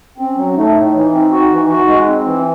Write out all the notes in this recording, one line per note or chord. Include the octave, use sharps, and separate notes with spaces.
C4 C#4
F#3
A3 D#4
A2
E3
C4
F#4
E3
F#4
G#3
C4
E3